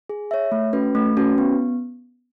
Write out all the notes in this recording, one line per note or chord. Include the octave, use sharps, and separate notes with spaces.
G#4
C#5 E5
A3
C#4 F#4 B4
A3
C#4 F#4 B4
B3